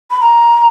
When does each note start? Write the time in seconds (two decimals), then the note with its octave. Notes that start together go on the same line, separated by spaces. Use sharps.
0.11 B5
0.21 A#5